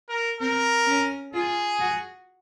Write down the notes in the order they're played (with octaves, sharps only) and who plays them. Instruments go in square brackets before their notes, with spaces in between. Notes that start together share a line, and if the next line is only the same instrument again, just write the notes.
[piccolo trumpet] A#4
[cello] C4 [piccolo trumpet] A#4
[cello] C#4
[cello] F4 [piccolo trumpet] G#4
[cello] F#4